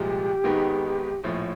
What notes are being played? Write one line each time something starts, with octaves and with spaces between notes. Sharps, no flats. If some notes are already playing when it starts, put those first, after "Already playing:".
Already playing: C2 A#2 F3 G#3 G4
G#1 G#2 D#3 G#3 B3
A#1 A2 F3 C#5